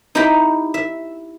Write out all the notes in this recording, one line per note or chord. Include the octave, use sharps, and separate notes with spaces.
D#4 E4 G4 D#5 G5 B5
E5